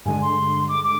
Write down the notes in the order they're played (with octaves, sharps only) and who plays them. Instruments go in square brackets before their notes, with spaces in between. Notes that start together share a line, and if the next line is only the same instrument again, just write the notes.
[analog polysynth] G2 D3 G#3 D4 [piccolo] G#5
[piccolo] C6
D6
D6